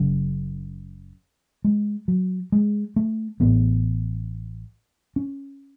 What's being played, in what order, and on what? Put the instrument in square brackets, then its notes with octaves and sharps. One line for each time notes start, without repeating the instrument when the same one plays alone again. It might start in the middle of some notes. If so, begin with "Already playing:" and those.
Already playing: [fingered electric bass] F#1 F#2 C#3
G#3
F#3
G#3
A3
A1 A2 B3
C#4